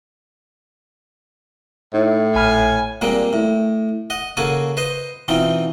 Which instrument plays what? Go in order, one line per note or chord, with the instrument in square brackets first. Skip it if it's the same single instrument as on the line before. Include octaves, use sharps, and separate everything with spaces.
[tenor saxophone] A2 [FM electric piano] D#4 E4
[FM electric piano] A#1 B5 F6 [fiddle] G#5
[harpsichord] A#2 G3 G#3 A#3 C4
A2
D#5 F#5
C#3 A#3 F#4 A4 G#5
B4 C5 D#5
B2 E3 C4 D#4 F4